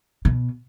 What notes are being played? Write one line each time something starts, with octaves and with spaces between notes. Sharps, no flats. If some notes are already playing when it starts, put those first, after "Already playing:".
B2